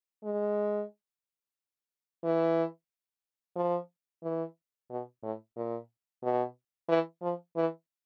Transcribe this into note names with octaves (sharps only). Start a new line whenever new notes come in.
G#3
E3
F3
E3
B2
A2
A#2
B2
E3
F3
E3